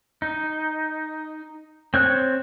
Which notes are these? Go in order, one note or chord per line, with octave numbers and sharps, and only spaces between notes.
D#4
C4 C#5 F#6